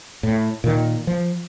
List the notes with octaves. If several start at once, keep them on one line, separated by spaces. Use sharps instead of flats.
A2
A#2 D#3
F3